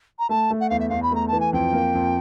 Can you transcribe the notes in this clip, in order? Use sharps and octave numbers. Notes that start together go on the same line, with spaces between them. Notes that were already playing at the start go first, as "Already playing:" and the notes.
A#5
A3 A5
A3
F#5
E2 F5
E5
E2 F5
B5
A3 A#5
E3 A5
G#5
F2 G5
A#3
F2